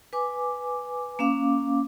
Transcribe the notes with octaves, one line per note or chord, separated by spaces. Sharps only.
B4 G#5 D6
A#3 C#4 F5 D6